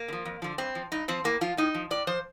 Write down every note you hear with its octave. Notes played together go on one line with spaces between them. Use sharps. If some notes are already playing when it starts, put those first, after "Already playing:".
Already playing: A#3
D3
F3
F2
D3 F3
G2 C4
F3
G2 D#4
F3 C4
A2 A#3
F3 F4
A2 D#4
F3
A2 D5
F3 C5